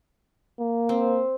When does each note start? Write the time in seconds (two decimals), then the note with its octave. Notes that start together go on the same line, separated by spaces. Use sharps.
0.60 A#3
0.89 C4